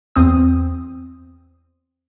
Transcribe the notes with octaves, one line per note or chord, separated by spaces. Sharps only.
E2 C4 D#6